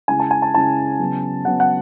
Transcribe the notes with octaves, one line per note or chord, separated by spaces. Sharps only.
C#3 G#3 C#4 E4 G#5
A5
G#5
A5
C#3 G#3 C#4 E4 A5
C#3 F#3 B3
C#3 F#3 B3 F#5
F#5